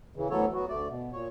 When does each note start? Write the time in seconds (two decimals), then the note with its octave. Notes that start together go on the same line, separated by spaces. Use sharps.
0.16 C#3 E3
0.30 D2 E3 F#3 B3 A4 C#5
0.53 F#3 B3 F#4
0.68 D2 A3 D5
0.88 B2
1.12 A#2 C#5